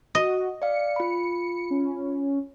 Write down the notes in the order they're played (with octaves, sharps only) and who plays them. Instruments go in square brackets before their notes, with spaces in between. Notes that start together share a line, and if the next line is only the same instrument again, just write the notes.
[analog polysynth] F#4 [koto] D#5
[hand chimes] D5 F5 [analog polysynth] C#7
[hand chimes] F4 B5
[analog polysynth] C#4